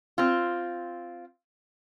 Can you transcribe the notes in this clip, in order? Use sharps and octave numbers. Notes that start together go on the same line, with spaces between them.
C4 F4